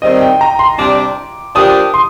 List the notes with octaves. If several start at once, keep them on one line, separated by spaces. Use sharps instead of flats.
D#3 G3 C4 D#5
G5
A#5
C6
C3 G3 D4 G4 D6
F3 A#3 D4 G4 D#6
C6